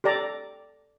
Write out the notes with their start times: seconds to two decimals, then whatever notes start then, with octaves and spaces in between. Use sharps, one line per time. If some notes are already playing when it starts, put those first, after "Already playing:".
0.04 G4 A4 D5 A#5